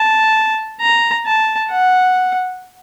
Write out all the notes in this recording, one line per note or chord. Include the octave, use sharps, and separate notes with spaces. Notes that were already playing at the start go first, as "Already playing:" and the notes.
Already playing: A5
A#5
A5
F#5